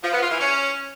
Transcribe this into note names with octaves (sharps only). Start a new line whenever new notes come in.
F3
B3
F4
E3
C#4